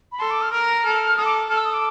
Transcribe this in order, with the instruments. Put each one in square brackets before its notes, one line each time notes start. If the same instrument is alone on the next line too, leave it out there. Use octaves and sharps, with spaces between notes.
[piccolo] B5
[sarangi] A4 [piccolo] C6
[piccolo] D6
F6
[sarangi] A#4 [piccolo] F6
[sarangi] A4
[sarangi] A4 [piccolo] D#6
[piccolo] D6
[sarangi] A4 [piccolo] F6
[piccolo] E6
D#6
D6